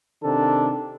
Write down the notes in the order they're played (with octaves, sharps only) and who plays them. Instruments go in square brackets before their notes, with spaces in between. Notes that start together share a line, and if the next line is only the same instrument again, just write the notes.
[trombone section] C3 D#3 D4 A4